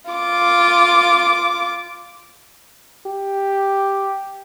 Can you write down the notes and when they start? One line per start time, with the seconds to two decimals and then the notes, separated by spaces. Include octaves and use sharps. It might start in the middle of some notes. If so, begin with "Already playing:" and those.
0.11 F4 D6
3.06 G4